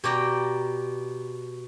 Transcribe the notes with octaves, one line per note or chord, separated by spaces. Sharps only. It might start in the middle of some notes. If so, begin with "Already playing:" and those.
B2 G4 D5 A#5